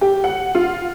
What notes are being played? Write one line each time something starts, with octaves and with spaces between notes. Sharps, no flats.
G4
F#5
F4